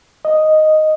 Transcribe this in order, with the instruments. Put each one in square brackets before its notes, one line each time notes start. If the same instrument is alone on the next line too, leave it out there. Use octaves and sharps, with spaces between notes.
[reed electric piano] D#5